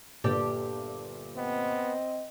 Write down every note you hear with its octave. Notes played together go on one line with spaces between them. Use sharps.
G1 A#2 G4 A4 B4 D5
B3 C4 D#5